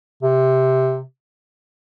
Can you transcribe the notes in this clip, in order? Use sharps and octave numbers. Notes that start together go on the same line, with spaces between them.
C3